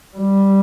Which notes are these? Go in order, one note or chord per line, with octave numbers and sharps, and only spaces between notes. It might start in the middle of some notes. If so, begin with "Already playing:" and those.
G3